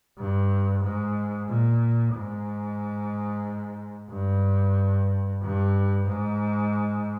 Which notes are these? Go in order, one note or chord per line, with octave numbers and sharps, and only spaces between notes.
G2
G#2
A#2
G#2
G2
G2
G#2